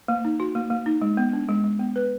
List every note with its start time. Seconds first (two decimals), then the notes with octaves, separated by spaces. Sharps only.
0.08 A#3
0.25 D#4
0.40 F#4
0.55 A#3
0.70 A#3
0.86 D#4
1.02 G#3
1.17 B3
1.33 D4
1.49 G#3
1.64 G#3
1.79 B3
1.96 B4